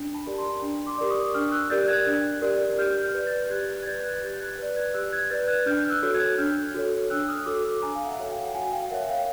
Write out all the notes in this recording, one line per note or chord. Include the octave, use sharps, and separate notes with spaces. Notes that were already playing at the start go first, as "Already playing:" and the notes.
Already playing: D4
A5 B5
G4 A#4 D5
A#5 C6
D4
C6 D6
G4 A#4 D5
C#6 D#6
D4 D#6 F6
E6 F#6
G4 A#4 D5 G6 A6
F#6 G#6
D4
G4 A#4 D5
G4 F6 G6
F6 G6
B4 D5
G6 A6
A6
G4 F#6 G#6
G#6
B4 D5 G6 A6
F#6 G#6
G4 G6 A6
A6
F#6 G#6
B4 D5
F#6 G#6
G4 E6 F#6
F#6 G#6
B4 D5 G6 A6
F#6 G#6
D4 F6 G6
F6
E6 F#6
F#4 A4 C#5
F#6 G#6
D4 F6 G6
F#4 A4 C#5
D4 E6 F#6
D#6 F6
F#4 A4 C#5 D6 E6
D6 E6
D4 G#5 A#5
F5
E5 F#5
F#4 A4 C#5
F5 G5
F#5
G5
F#4 F#5 G#5
F5 G5
A#4 C#5 E5 F#5
F5 G5